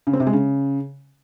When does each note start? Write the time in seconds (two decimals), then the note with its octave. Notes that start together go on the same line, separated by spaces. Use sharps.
0.07 C#3
0.13 C4
0.20 C3
0.27 G#3
0.33 C#3